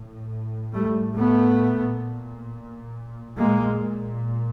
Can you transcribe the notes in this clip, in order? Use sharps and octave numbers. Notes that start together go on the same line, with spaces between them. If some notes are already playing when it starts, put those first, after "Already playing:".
Already playing: A2
G3 A3
A3 B3
A#2
A#2 G#3 A#3